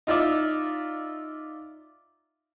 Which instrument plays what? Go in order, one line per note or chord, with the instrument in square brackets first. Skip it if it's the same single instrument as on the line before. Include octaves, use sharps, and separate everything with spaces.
[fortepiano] D#4 F4 D5 E5